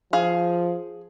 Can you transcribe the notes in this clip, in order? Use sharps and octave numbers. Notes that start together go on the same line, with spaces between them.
F3 G#4 F5